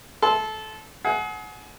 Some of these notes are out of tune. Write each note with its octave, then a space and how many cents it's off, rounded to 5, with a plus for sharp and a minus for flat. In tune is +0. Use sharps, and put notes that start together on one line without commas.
A4 -20 C6 +0
G#4 +35 F#5 +0